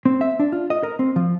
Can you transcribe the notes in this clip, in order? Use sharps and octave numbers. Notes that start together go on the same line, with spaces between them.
C4
E5
D4
F4
D#5
A#4
C4
F3